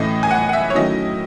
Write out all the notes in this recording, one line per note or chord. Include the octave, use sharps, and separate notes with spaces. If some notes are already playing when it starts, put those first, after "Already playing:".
Already playing: A2 E3 A3 C#4 D#5
G#5
F#5
F#5
E5
C#5
D#3 F#3 A3 C#4 E4 D#5